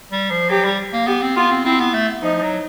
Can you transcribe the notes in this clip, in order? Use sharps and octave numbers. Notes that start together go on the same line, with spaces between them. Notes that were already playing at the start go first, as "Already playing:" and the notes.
G3
F3
F#3 G4
G3
A#3
B3 G4
C4
B3 F4
C4
C4 E4
B3
A3
F3 D#4
F#3